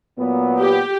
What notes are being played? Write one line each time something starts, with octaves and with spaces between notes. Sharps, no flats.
A#2 F#3 B3
G4